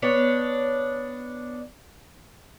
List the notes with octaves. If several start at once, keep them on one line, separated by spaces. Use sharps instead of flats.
B3 D4 C#5